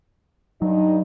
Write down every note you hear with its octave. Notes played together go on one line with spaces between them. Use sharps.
G2 F#3 D#4